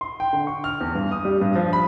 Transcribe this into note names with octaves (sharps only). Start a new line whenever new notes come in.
C6
G5
D3
C#6
F6
E2
G2
D#6
G3
G2
F3
B5